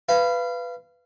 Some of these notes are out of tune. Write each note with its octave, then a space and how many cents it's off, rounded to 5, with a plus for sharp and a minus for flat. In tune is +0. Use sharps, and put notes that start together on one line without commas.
B4 +10 F5 -25